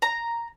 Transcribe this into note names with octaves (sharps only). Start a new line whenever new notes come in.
A#5